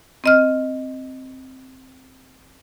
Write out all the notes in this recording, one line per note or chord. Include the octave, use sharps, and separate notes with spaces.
C4 D#5 F6